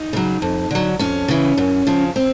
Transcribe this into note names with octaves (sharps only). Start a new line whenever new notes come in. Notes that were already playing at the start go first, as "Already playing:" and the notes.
Already playing: D#4
C#3 F#3
F2
D3 F#3
F2 C#4
C#3 E3
F#2
C#3 F3
C4